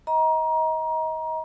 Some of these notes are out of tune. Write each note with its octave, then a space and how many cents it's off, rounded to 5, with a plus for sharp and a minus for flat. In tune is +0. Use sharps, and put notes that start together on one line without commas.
D#5 +30 A#5 +25